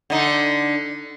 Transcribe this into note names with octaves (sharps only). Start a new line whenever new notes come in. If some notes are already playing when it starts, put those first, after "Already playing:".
D3 D#4